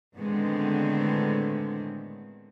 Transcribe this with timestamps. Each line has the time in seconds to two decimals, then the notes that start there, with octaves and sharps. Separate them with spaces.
0.18 A2 D3 D#3 G#3 B3 C4